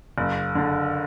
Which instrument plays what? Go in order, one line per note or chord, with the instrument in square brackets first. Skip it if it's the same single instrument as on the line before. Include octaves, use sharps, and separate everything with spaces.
[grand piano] F#1
D3